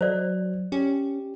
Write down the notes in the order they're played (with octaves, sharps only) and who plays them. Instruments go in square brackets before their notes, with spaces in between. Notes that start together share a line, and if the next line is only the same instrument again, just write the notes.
[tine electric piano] F#3 [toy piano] C5 D5
[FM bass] C#4 [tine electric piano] G4